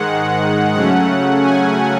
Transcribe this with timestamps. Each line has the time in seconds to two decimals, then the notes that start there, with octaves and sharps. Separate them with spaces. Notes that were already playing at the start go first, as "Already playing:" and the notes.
Already playing: G#2 D#3 G#3 F#5
0.74 C#3 F#3 A3 C#4 F#5
1.41 G#5